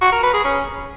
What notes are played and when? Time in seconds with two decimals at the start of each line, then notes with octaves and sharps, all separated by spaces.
0.01 F#4
0.12 A#4
0.23 B4
0.34 G#4
0.44 C#4